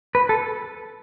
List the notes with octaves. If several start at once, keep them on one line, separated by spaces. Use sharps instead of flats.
B4
A4